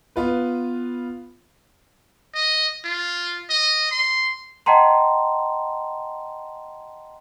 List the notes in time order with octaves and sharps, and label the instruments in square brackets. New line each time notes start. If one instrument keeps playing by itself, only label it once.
[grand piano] B3 F4 B4
[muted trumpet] D#5
F4
D#5
C6
[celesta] D#5 F#5 G5 A5 A#5 C6